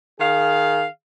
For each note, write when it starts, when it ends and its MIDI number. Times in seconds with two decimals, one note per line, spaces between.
0.20 0.86 51
0.20 0.86 68
0.20 0.86 77